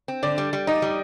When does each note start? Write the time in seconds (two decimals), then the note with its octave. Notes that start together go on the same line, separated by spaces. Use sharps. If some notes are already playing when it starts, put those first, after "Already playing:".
0.08 C4
0.23 D3 D5
0.38 G3
0.53 G3
0.67 D#4 D#5
0.82 G3